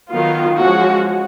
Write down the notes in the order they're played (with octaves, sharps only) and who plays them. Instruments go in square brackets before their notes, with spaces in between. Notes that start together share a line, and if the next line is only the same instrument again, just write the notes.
[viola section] D#3 F#3 B3 F4
F3 G#3 C#4 F#4